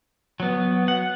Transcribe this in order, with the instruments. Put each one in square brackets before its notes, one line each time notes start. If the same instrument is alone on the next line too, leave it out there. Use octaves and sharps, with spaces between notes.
[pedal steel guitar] F#3 B3
F#5